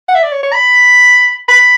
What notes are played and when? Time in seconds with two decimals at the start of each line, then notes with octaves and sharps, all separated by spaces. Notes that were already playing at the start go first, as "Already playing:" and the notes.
0.09 F#5
0.16 E5
0.23 D5
0.33 C#5
0.43 C#5
0.54 B5
1.49 B5